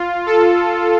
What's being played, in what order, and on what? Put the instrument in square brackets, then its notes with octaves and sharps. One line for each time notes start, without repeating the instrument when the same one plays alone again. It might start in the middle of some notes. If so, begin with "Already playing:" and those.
Already playing: [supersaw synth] F4
A4